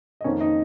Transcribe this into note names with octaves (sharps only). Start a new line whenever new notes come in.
D#5
F2 D#3 A#3 C#4 C#5
D#4 D#5